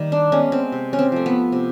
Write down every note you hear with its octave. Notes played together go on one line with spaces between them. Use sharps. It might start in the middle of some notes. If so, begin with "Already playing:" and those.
Already playing: D#3 G3 A#3
D4
G#3 B3 C#4
C4
C3
C#4
C4
F3 A3
B3
C3